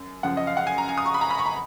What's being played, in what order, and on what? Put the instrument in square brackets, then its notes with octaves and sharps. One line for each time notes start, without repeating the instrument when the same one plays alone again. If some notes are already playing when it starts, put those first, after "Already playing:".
Already playing: [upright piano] F#2
F#2 C#3 F3 F#5
D#5
F5
F#5
G#5
A#5
G#5
D#6
C#6
B5
A#5
B5
C#6
A#5